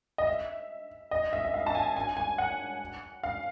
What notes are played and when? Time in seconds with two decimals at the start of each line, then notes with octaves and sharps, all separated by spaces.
0.18 D#5
0.27 E5
1.11 D#5
1.33 E5
1.45 E5
1.54 F5
1.67 A5
1.75 G#5
1.97 G#5
2.17 G#5
2.38 F#5
3.23 F5